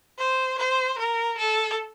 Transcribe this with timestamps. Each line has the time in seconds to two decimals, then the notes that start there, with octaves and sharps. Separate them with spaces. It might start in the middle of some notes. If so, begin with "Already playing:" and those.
0.18 C5
0.58 C5
0.98 A#4
1.38 A4